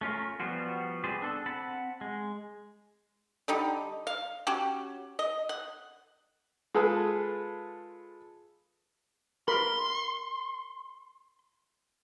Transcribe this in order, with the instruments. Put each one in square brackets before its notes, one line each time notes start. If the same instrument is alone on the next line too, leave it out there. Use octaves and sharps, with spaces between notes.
[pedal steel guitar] A3 C#4 F4 A#4
F3 G3 B3 F4 F#4
B3 C4 G#4 C5 D5
D4 A4
C4 F#5 A5 B5
G#3
[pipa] D3 G3 D#4
F5
C#4 F#4 G4
D#5
F#5
[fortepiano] G#3 F4 G#4 A4 B4
[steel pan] A#4 B5 [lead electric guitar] C6